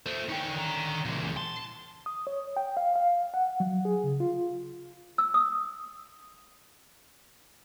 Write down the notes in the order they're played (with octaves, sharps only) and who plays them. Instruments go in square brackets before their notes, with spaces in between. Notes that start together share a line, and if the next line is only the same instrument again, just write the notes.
[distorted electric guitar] A3 [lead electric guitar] A4 C5
[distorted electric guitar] D3 C#4 [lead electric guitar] D#4 G5
[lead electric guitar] D#3 A#5
[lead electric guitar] A#2 E3 [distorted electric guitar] C#3 G#3
[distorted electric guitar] A5 [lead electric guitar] C6
[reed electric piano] D#6
C#5
G5
F5
F5
F#5
F#3
G#4
C#3
F4
[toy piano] E6
D#6